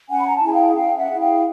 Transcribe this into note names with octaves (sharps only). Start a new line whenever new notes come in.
C#4 F#5 G#5
B5
A#5
A5
E4 G#4 G#5
F5 G5
C#4 F5 G5
E5 F#5
E4 G#4
F5 G5